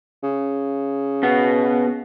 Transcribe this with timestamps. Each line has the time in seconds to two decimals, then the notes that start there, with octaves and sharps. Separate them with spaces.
0.23 C#3
1.23 B2 B3